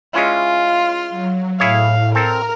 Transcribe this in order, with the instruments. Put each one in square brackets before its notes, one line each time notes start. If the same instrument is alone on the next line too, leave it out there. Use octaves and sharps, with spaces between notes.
[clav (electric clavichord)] G#3 C#4 E4 [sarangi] F4
[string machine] C6 F6
F#3
[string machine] A2 [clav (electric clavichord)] E4 G#4 C#5 [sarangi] F5
[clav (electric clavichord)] C4 A4 [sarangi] A#4 [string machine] A#5 F6